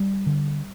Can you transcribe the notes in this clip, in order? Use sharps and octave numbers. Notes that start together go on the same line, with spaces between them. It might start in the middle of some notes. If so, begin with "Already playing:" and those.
Already playing: G3
D3